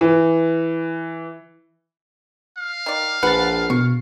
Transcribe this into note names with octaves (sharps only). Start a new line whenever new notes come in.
E3
F5
D#3 D5
A#1 B4 F#5 A6
B2 C#6